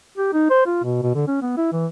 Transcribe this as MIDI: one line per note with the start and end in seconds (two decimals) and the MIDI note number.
0.18 0.32 67
0.33 0.49 63
0.50 0.65 72
0.66 0.82 65
0.83 0.99 47
1.02 1.13 47
1.15 1.23 50
1.28 1.39 61
1.42 1.53 59
1.57 1.70 64
1.72 1.86 52